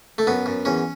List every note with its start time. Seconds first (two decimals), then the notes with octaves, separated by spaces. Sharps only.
0.18 A3
0.27 F#2 B3
0.46 F#2
0.65 E2 C#4